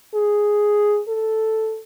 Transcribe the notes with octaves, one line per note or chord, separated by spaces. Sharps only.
G#4
A4